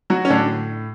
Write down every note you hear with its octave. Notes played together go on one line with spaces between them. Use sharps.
F#3 F#4
C#4
A2 D3 D4